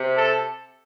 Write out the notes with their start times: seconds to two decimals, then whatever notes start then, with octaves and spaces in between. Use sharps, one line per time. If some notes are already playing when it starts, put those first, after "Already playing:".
Already playing: C3
0.16 A4